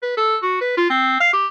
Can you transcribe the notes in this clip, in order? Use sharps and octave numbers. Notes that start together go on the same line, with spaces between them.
B4
A4
F#4
B4
F4
C4
F5
G4